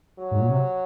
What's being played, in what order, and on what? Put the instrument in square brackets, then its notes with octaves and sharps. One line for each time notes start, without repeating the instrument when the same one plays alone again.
[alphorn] F#3
[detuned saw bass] G#2
A#2
C3